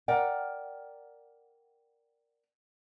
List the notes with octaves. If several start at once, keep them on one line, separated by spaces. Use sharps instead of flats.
A#4 D5 F#5 G5